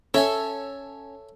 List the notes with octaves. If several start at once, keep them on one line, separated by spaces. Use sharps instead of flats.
C#4 A4 C#5 E5 G#5